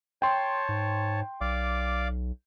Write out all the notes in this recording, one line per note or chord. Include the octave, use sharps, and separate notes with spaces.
C#5 G5 A5 C6
G#2
B1 D5 F5 D6